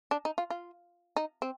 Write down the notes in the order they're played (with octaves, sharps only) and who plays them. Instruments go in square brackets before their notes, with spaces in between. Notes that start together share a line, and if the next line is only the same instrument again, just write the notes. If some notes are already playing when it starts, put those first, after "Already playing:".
[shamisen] D4
D#4
F4
F4
D#4
C4